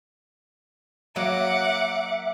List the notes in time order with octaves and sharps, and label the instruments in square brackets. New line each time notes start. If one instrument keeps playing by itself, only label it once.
[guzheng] F#3 A#3 [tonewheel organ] E5 [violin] F#5 D6